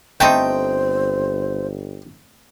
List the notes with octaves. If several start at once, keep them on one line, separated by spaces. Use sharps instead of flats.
G1 A3 C4 D#4 C5 G5